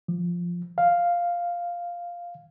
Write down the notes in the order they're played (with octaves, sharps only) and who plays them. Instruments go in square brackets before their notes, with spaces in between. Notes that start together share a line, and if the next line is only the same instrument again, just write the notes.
[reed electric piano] F3
F5